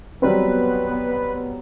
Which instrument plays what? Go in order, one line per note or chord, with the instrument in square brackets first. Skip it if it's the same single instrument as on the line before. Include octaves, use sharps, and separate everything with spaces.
[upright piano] F#3 G3 C4 [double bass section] B3 [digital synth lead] B4